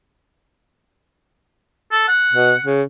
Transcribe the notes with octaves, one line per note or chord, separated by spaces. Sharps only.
A4
F#5
B2
C#3